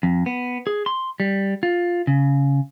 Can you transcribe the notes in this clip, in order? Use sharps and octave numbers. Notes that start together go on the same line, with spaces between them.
F2
B3
G#4
C6
G3
F4
C#3